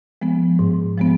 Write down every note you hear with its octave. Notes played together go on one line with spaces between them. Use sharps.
F3 G#3 B3
G#2
F3 G#3 B3